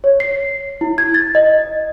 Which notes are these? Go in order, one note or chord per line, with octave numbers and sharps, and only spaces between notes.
C#5
C7
E4
G#6
A6
D#5